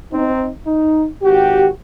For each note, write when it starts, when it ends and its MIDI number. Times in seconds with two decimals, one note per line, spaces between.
0.12 0.47 60
0.12 0.47 63
0.67 1.05 63
1.23 1.68 32
1.23 1.68 66
1.23 1.68 67